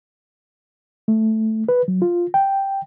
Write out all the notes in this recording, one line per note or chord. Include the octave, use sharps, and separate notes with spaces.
A3
B4
F#3
F4
G5